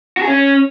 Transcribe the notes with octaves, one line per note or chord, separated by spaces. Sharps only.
F#4
G#4
C#4